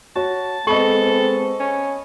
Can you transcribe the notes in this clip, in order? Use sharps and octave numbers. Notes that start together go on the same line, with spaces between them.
F#4 C#5 A5
G#3 B3 C4 A4 D#5 B5 C#6
C#4